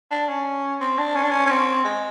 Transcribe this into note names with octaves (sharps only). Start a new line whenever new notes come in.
D4
C#4
C4
D4
C#4
D4
C#4
C#4
C4
G#3